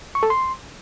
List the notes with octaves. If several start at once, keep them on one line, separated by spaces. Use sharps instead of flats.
C#6
A4
C6